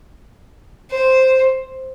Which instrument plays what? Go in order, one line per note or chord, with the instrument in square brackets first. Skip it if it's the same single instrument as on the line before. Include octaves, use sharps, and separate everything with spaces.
[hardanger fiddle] C5